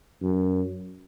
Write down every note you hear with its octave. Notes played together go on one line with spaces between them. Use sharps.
F#2